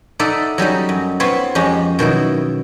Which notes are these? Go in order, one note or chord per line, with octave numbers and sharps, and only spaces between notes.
D#4 A4 D5 E5 F#5
F#3 G3 C#4 D#4
F#2
B3 C4 F4 C#5 F5 B5
F2 G#3 C#4 G4 A#5
B2 D#3 F#3 E4